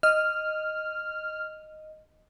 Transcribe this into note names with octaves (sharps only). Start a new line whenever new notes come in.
D#5 F6